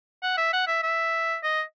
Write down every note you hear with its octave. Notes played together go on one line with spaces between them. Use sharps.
F#5
E5
F#5
E5
E5
D#5